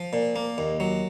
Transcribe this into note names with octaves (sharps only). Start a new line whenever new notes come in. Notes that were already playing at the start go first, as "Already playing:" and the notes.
Already playing: F3
A#2
A#3
D#2
F#3